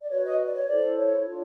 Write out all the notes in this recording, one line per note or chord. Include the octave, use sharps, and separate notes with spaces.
D5
F#4 B4 C#5
D#5
D5
C#5
E4 A4 C5 D5
C#5
D4 F4 A4 C#5